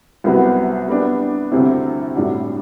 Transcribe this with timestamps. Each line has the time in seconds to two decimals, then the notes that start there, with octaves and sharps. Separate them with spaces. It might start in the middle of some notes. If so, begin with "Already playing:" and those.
0.24 C2 C3 F#3 B3
0.88 G3 B3 D4
1.52 D2 C3 G3 C4 E4
2.15 A2 G3 D4 F#4